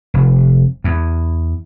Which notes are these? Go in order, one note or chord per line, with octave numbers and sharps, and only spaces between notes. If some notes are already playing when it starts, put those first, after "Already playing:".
F1
E2